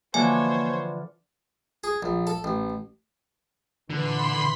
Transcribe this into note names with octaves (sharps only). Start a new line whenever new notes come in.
D3 E3 F3 A#3 C5 C#5 G#5
G#4
A#1
A4
A1
A#2 D3 E3 B5 C6 B6